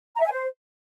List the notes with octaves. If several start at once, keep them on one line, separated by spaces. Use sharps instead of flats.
A#5
E5
G#5
C5